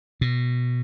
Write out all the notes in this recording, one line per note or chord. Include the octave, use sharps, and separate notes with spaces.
B2